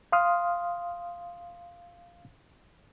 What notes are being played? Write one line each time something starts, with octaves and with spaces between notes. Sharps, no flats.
F5 C6 D#6 F6